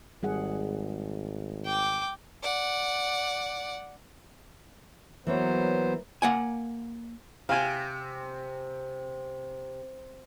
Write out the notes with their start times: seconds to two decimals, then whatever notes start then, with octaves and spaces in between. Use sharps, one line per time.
0.23 G#1 G3 G#4 F#5
1.66 G5 D6
2.42 D5 F#5
5.27 E3 F#3 A#3 B3 C5 C#5
6.22 A#3 F#5 G#5
7.49 C3 F5 G#5